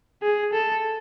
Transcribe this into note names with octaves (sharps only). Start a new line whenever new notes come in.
G#4
A4